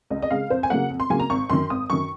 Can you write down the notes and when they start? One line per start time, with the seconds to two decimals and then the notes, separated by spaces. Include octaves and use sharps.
0.10 C#2 D#5
0.22 D#5
0.31 C#3 G#3 F5
0.50 F2 C5
0.63 G#5
0.70 C#3 F#3 A#3 F#5
0.90 F2
1.00 C6
1.10 C#3 F#3 A#3 G#5
1.20 A#5
1.30 G#1 C#6
1.50 F#2 D#3 C6
1.70 G#1 D#6
1.90 F#2 D#3 C#6